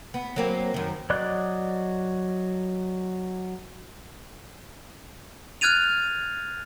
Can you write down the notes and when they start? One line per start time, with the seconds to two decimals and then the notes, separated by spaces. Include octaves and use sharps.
0.14 B3
0.36 F#3 A#3 C4
0.74 F#2 D#3
1.10 F#3 D5 D#5 D6 F#6
5.61 F6 F#6 G#6 A6 D#7 F7